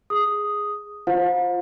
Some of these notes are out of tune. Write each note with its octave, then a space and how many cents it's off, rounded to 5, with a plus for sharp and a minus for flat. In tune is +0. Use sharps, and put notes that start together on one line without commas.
G#4 +0 D#6 +0
F4 +0 C5 +10 F5 +40